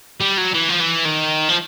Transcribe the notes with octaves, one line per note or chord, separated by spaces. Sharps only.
G3
F#3
E3
F3
E3
D#3
F3